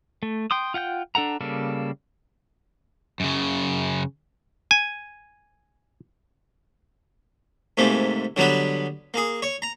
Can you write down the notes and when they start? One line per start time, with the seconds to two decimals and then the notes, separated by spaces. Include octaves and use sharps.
0.23 A3
0.51 G5 C6 D#6
0.74 F4 F#5 G5 G6
1.15 D4 A4 F#5 A#5
1.41 C#3 G3 A#3 A4
3.20 F#2 C#3
4.71 G#5
7.77 G#2 C3 A3 A#3
8.36 D3 F#3 G3 B3 B4
9.14 A#3 G#4
9.42 C#5
9.62 A#5